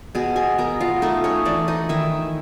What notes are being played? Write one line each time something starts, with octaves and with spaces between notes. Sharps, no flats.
B2 G#4 G#5
G#4 G#5
B3 A#4 A#5
F4 F5
A3 D#4 D#5
C#4 C#5
E3 D4 D5
D#4 D#5
D#3 E4 E5